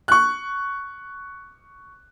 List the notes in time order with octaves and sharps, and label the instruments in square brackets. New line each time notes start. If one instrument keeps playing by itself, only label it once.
[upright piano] C#6 F#6